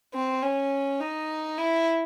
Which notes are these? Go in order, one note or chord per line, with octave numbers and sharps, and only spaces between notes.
C4
C#4
D#4
E4